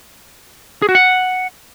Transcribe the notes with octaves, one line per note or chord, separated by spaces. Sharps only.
G#4
F#4
F#5